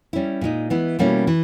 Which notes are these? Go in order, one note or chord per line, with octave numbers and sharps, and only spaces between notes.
G3 C#4 E4
A#2 G#3 D#4
E3 G#3 B3 E4
B2 G3 A#3 C#4 E4
E3